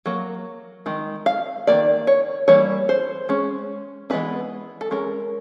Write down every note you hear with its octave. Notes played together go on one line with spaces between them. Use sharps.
F#3 A#3
D#3 G#3
F5
D#3 F#3 A#3 D5
C#5
E3 G3 A#3 C#5
C5
G#3 C#4
E3 G#3 B3 D4 B4
A4
G#3 C#4 A#4